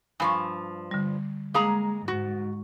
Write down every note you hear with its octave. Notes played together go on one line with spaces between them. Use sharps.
G2 F3 G#5 C#6
D3 G3
G#3 A#3 G#4 A#5
G#2 F#4